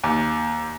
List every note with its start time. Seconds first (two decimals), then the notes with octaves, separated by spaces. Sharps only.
0.04 D#2